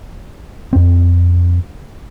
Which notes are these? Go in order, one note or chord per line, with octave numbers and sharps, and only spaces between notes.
F2 C4